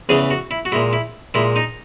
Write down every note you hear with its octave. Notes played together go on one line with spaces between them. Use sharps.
E2 C#3 E3 G#4
F#4
E4
F#4
A#2 G#3 E4
E4
A#2 G#3 E4
D#4